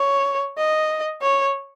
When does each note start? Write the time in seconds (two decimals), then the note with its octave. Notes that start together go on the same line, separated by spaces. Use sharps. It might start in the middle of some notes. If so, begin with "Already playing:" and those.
Already playing: C#5
0.58 D#5
1.22 C#5